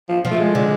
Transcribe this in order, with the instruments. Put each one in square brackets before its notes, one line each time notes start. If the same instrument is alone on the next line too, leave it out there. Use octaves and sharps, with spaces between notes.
[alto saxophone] F3
[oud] F3
[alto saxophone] A3
G#3
[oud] D3